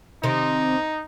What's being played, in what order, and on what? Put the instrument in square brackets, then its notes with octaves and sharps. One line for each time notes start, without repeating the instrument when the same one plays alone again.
[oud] C3 D#3 [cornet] D#4